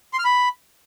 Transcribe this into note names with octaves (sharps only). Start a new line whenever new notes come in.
C6
F6
B5